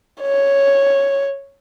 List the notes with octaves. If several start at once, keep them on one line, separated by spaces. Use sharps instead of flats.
C#5